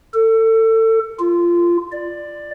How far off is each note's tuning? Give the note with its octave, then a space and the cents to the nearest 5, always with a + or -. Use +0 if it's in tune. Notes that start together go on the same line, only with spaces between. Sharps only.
A4 +30
F4 -15
D5 +10